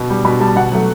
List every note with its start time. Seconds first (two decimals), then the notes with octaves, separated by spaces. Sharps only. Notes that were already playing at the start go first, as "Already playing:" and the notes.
Already playing: B2
0.10 G3
0.25 B2 B5
0.40 G3 A5
0.56 B2 F#5
0.72 F#3 A3